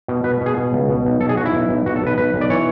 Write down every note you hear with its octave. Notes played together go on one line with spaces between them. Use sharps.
B2
B2 B4
B2 G#4
B2
C#2
B2
B1
B1 A4
G#4
B1 F#4
E4
B1
B1
B1 F#4
A4
B1 B4
B1 B4
B1
D5
E3 C#5